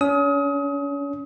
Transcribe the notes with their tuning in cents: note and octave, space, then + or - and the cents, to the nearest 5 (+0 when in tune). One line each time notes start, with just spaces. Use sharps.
C#4 +35 D#6 +30